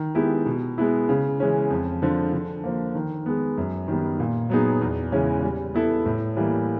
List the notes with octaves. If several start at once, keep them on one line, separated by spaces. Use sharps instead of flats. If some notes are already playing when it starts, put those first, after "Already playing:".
Already playing: D#3
G#3 B3 E4 G4
B2
G#3 B3 E4
C#3
E3 G#3 C#4
F2
D3 F3
D3
F3 A#3
D#3
G#3 B3
F#2
D#3 G3 B3
A#2
F#3 B3 D#4 G#4
E2
C#3 E3 G#3 C#4
G3
B3 E4 A4
A2
E3 G3 A#3